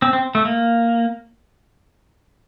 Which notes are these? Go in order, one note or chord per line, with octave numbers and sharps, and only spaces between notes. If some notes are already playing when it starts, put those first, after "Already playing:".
C4
C4
A3
A#3